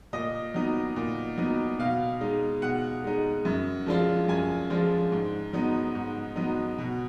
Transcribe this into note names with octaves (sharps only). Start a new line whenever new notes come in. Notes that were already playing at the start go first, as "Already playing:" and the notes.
A#2 D#5
F#3 B3 D#4
A#2
F#3 B3 D#4
B2 F5
G#3 D#4
B2 F#5
G#3 D#4
F#2
F3 G#3 D4 F4
F#2 G#5
F3 G#3 D4 F4
G#2
F#3 B3 D#4
G#2
F#3 B3 D#4
B2